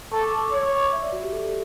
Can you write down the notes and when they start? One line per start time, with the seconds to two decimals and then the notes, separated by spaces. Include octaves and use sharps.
0.12 A4 C#6
0.21 D6
0.32 C#6
0.41 D6
0.52 C#5 E6
0.62 E6
0.72 D6
0.82 C#6
0.93 E5
1.03 D5
1.12 F#4
1.23 G4
1.33 A4